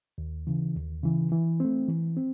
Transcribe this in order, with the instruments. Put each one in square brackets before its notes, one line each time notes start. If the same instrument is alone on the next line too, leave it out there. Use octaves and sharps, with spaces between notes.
[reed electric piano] D#2
C#3 E3
D#2
C#3 E3
E3
A3 C4
E3
C4